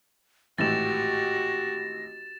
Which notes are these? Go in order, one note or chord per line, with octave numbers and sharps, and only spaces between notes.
G#1 A2 E3 F#4 G4 A6 A#6 E7